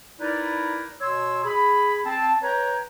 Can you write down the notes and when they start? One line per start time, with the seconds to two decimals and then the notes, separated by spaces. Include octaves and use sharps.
0.20 D#4 E4 A#4 B4 D5
1.01 B2 C#5 C6 E6
1.44 G#4 B5
2.05 C4 A5
2.43 B4 C#5 G5 A#5